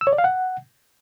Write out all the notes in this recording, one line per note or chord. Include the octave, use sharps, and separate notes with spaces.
E6
C#5
D5
F5
F#5